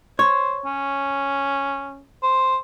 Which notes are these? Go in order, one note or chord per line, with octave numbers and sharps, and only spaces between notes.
C5 C#5
C#4
C5